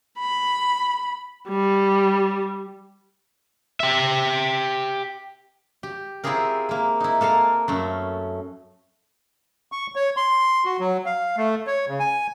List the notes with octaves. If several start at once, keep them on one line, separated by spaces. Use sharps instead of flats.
B5
G3
G4 E5
G4
C4 E4 F4 G4 G#4 A#4
A#3 E4
D#4 E4
A#3 A4 A#4 F5
F#2 A3 C#4
C#6
C#5
C6
F#4
F#3
F5
A3
C#5
C#3
G#5